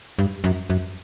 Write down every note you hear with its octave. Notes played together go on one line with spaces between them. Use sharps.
G2
F#2
F#2